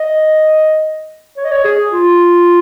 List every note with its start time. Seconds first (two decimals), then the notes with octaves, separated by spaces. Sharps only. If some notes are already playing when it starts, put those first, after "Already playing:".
Already playing: D#5
1.37 C#5
1.44 D#5
1.51 C#5
1.65 G#4
1.92 F4